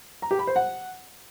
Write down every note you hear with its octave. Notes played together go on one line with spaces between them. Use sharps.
A#5
G4
B5
C5
F#5